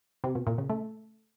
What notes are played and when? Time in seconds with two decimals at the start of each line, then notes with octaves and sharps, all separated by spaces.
0.24 C3
0.35 B2
0.47 A#2
0.58 C#3
0.70 A3